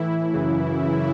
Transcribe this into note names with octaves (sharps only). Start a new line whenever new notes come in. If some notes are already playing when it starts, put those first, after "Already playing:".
Already playing: A2 E3 E4
F#2 C#3 E3